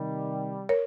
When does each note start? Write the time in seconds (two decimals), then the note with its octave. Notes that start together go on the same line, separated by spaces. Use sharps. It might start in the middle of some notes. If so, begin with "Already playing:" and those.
Already playing: C3 D#3 G3
0.69 A#4 C#5